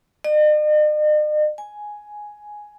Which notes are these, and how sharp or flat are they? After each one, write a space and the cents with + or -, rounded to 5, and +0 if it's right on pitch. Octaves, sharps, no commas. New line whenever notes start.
D#5 -45
G#5 +5